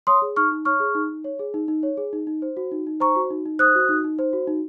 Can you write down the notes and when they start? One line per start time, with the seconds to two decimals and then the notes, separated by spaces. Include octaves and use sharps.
0.07 C#5 C6 D#6
0.22 G#4
0.36 D#4 C#6 F6
0.51 D#4
0.65 C#5 C#6 F6
0.80 G#4
0.95 D#4
1.09 D#4
1.24 C#5
1.39 G#4
1.54 D#4
1.68 D#4
1.83 C#5
1.97 G#4
2.13 D#4
2.27 D#4
2.42 C5
2.57 F#4
2.71 D#4
2.87 D#4
3.00 C5 A#5 C#6
3.16 F#4
3.30 D#4
3.45 D#4
3.59 C5 D#6 F#6
3.75 F#4
3.89 D#4
4.04 D#4
4.19 C5
4.33 F#4
4.47 D#4